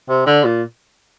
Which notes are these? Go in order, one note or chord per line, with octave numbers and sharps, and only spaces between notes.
C3
D3
A#2